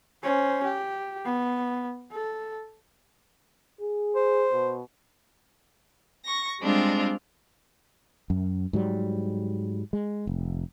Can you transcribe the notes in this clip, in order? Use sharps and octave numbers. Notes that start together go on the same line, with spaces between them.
C#4 C5
G4
B3
A4
G#4
C5
B2
C#6 A#6
G3 G#3 C4 D4 F4
F#2
G#2 F#3 G3
G#3
F1